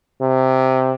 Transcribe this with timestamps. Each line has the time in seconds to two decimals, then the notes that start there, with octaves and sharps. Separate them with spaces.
0.21 C3